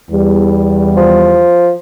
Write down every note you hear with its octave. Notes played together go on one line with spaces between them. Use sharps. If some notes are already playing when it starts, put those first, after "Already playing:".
E2 G3
F3